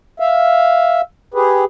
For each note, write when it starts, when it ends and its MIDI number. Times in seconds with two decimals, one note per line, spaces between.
0.20 1.01 76
0.20 1.01 77
1.34 1.64 67
1.34 1.64 68
1.34 1.64 71